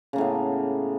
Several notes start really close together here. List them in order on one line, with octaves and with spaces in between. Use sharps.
C#3 A#3 A2 B3